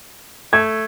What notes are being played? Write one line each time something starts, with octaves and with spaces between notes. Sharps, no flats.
A3 G#6